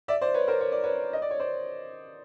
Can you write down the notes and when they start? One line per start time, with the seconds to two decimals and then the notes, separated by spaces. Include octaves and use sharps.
0.08 D5 E5
0.21 C5 D5
0.34 B4 C#5
0.48 A#4 C5
0.61 C#5
0.72 D5
0.84 B4 C#5
1.13 D#5
1.22 D5
1.31 C#5
1.40 C5 D5